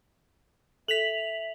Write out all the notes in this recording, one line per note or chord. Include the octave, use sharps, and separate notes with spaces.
A4 E5 B6 F7 F#7